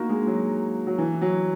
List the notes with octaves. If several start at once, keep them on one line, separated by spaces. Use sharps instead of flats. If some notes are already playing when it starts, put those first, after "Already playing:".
Already playing: A#3 D#4 F#4
G#3
F#3
F#3
E3
F#3